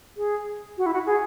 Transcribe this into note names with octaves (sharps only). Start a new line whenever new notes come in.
G#4
F#4
E4
F#4
G#4